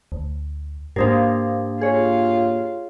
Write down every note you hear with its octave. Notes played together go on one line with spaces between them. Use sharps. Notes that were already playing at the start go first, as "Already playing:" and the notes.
D2
G#2 A#3 D4 G4 A#4 C5 F5
F4 G#4 C#5